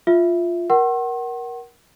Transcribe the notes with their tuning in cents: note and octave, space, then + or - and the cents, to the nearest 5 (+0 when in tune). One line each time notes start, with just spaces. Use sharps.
F4 +0 E5 +0
A#4 +20 F#5 +30 C6 +45